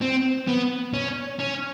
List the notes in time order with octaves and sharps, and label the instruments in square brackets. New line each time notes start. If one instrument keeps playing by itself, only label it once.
[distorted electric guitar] C4
B3
C#4
C#4